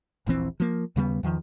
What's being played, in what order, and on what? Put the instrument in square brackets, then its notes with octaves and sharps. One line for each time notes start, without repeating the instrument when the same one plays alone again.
[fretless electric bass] D#1 A#1 E3 C4
F3 A#3
D#2 C#3 G3 B3
E2 D#3 F3